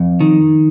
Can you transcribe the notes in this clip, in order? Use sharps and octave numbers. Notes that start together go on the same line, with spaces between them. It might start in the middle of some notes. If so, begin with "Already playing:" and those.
Already playing: F2
D#3